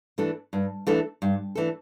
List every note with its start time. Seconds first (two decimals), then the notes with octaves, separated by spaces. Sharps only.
0.18 E3 A3 D4 A4
0.53 G2
0.87 E3 A3 D4 A4
1.22 G2
1.55 E3 A3 D4 A4